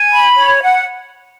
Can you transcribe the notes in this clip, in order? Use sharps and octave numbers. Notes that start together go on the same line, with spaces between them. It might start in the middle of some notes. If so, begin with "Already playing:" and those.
Already playing: G#5
B5
C#5
F#5